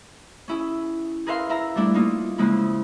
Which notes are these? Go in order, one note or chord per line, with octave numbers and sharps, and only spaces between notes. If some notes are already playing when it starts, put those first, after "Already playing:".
C#4 E4 G#4
G#4 A#4 B4 E5 F5 C6
E4 E5 A#5
G3 A3 D4 E4
A#3 D4 D#4 F4
C#3 F3 G#3 A#3 E4